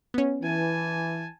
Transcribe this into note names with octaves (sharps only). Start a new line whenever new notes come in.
B3 C#4
E3 G#5 A5